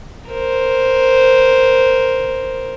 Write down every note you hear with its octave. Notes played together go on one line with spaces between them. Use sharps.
A#4 C5